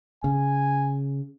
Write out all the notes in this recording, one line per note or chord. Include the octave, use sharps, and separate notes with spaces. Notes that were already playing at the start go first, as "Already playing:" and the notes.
C#3 G#5